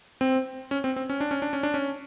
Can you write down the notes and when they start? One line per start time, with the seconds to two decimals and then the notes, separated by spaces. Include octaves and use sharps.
0.21 C4
0.71 C#4
0.84 C4
0.96 C4
1.10 C#4
1.21 D4
1.31 C#4
1.42 D4
1.53 C#4
1.63 D4
1.74 C#4